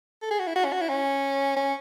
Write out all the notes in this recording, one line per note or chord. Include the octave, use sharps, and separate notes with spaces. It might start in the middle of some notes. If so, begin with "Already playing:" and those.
A4
G#4
F#4
E4
F#4
C#4
F#4
E4
C#4
C#4